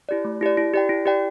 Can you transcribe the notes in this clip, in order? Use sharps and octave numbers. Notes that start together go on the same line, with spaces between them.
E4 G4 D5
A3
E4 G4 D5
E4
G4 D5 G5
E4
G4 D5 G5